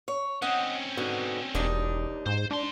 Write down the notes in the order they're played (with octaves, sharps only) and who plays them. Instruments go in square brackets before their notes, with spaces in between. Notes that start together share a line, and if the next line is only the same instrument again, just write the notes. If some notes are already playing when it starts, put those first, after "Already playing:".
[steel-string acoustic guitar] C#5
[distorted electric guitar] C4 C#4 [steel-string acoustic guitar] D#5 F#5
[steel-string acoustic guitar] G#2 B2 D3
[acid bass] E1 [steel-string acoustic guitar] D#2 D4 D#4
[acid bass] G#2 [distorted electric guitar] C5
[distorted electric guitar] G#2 C6 [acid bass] D4